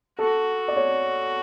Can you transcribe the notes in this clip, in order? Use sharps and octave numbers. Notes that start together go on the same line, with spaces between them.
F#4 A4
D5
C#5